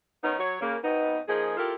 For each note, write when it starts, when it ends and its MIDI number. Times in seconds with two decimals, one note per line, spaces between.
0.24 0.37 51
0.24 0.37 59
0.24 0.37 61
0.24 0.37 63
0.39 0.59 54
0.39 0.59 73
0.61 0.77 49
0.61 0.77 58
0.83 1.19 47
0.83 1.19 59
0.83 1.19 60
0.83 1.19 63
0.83 1.19 75
1.28 1.56 53
1.28 1.56 58
1.28 1.56 63
1.28 1.56 68
1.57 1.74 64
1.57 1.74 65
1.57 1.74 67
1.57 1.74 69
1.57 1.74 70